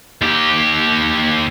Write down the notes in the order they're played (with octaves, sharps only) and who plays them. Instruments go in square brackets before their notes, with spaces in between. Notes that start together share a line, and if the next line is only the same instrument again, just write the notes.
[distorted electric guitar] D#2 G4